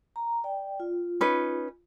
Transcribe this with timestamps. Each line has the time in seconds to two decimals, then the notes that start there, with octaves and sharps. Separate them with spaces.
0.16 A#5
0.44 D5 G5
0.80 F4
1.21 C#4 D#4 B4